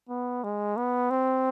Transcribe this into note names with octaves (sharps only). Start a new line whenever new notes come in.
B3
G#3
B3
C4